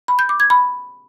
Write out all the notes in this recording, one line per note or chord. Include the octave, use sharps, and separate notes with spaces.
B5
G6
D6
G#6
B5